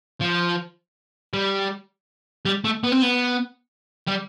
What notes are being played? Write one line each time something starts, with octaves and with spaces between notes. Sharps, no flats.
F3
G3
G3
A3
B3
C4
B3
G3